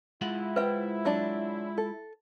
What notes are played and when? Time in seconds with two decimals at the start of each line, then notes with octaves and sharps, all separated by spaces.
0.21 G#3 E4 F4 F#5
0.56 B4 C5 E5 G5
1.05 F#3 D4 D5
1.78 A4